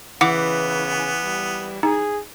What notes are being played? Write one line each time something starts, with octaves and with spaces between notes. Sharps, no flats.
C#3 E3 B3 F#5 D6
G3
D#4 G#4